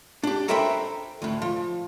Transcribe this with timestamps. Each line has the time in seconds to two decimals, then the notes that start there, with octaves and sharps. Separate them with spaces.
0.23 D4 G4
0.48 A4 A#4 C5 E5 G5 B5
1.22 D2 A2
1.42 F3